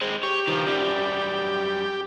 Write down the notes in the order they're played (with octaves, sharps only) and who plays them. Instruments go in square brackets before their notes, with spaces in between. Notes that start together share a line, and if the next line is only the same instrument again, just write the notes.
[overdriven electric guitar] G#3 C4
[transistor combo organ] G4 [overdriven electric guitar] C#5
[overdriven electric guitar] D#3 F3
F#2 G3